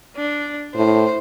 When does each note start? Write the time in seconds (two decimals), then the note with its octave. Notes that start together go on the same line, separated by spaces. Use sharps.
0.16 D4
0.75 A2 C5